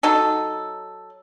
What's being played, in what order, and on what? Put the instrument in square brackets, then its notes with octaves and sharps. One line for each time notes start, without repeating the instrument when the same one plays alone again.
[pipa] F#3 D#4 A4